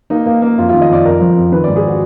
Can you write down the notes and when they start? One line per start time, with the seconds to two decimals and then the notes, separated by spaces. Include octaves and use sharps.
0.10 A#3 D#4
0.26 A#3
0.42 A#3
0.58 F2 F4
0.69 D#3 F4
0.81 D#5
0.89 F2 D5
1.05 F2 A#4
1.20 F3
1.37 F2
1.52 D#3 B4
1.64 G#2 D5
1.76 G#4
1.87 F#4